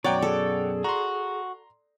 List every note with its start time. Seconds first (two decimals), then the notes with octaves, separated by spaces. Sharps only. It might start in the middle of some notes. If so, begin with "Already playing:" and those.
0.04 F#2 B2 C#5 D5 F#5 G5 A#5
0.22 G#4 A4
0.84 F#4 A#5 C6